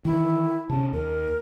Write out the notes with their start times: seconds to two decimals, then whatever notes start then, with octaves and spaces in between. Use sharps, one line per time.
0.05 D#3 E3 E4
0.70 C3 C#4 A5
0.93 D#2 A#4